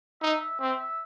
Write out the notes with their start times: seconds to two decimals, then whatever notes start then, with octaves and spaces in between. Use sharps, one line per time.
0.21 D#4 E5
0.40 E5
0.60 C4 E5
0.80 E5